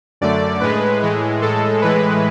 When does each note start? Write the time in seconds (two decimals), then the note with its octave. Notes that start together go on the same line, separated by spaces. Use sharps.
0.21 F#2 D3 A3 D5
0.61 A2 G#3 B4
1.02 A2 E3 G#3
1.42 A2 G#3 A4
1.82 A2 E3 G#3 B4